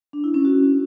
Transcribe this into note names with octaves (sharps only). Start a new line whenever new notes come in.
D4
E4
C#4
F#4